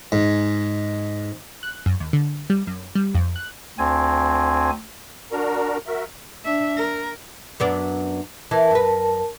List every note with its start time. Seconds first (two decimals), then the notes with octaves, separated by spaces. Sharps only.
0.12 G#2
1.63 F#6
1.86 F#2
2.00 D#2
2.13 D3
2.50 G3
2.67 F#2
2.95 G3
3.15 F2
3.36 F#6
3.78 D2 C4 G#5
5.32 D4 F#4 A#4 A#5
5.87 F#4 A#4 E5
6.44 D4 E5
6.77 A#4
7.60 F#2 B3 D4
8.51 E3 E4 A#4 A5
8.71 F#2 B4